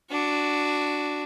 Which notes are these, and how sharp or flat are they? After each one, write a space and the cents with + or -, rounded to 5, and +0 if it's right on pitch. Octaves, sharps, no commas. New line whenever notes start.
D4 +0 F#4 +0